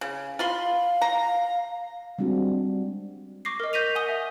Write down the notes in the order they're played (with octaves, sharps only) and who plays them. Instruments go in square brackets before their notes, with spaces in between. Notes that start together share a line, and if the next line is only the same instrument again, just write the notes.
[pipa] C#3
[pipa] F4 B5 C6 [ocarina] F5
[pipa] A#5
[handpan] G3 G#3 C4 D4 F#4
[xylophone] C#6 D6 A#6 C7
A#4 D#5
G6 A#6 B6 D#7 F7
F#5 G#5 D#6 G7
E5